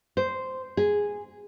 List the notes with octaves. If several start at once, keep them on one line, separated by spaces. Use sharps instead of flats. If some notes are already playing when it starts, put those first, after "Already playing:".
C5
G#4